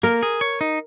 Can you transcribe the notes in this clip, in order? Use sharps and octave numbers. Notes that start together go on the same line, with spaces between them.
A#3 A#4
G#4
C#5
D#4